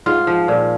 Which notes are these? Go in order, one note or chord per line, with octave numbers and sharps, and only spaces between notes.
G#2 F4
F3
A#2